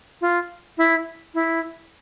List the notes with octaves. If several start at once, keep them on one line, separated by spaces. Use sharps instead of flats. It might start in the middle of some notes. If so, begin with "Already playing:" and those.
F4
E4
E4